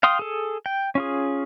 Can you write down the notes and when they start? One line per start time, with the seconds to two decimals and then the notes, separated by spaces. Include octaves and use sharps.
0.03 F5 G5 C6 D#6
0.19 G#4 A4
0.66 G5
0.95 C#4 F4 G#4